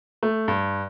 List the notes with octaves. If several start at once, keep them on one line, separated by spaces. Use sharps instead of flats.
A3
G2